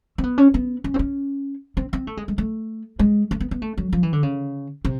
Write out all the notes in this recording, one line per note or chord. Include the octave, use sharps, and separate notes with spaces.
C4
B3
C#4
B3
C#4
C4
C#4
C4
C4
A3
G#3
G#3
A3
G#3
A3
B3
B3
A3
F#3
F3
E3
D3
C#3
C3